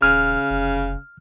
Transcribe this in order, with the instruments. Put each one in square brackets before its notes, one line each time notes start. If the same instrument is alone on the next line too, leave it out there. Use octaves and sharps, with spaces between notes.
[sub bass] D#1 [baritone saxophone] C#3 [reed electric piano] F6
[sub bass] F1